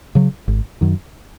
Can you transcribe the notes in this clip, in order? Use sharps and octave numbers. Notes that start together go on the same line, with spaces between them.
C#3 F#3
G#1
F#2 D#3